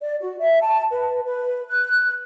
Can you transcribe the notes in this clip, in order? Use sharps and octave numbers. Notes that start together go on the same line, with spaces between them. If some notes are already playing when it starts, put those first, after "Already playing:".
D5
F#4
E5
A5
B4
B4
F#6